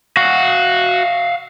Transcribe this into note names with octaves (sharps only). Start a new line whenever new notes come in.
F#4 F5 F#5